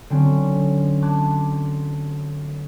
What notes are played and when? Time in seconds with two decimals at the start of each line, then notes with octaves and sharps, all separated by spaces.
0.10 D3 F#3 C4 C#4
1.02 A5 C6 D6 F#6 G#6